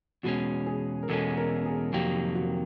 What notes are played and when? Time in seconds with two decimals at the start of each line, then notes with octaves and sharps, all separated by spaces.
0.23 E2 B2 G#3 C#4 F#4
0.67 G#4
1.03 A#4
1.09 E2 B2 G#3 C#4 A4
1.37 A#4
1.66 G#4
1.93 F2 C3 D#3 F#3 A#3 G4
2.35 F#4